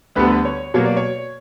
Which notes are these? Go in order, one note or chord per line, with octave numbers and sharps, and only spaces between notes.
D2 D3 G3 B3 B4
C#5
B2 F#3 A#3 C#5
D5
C#5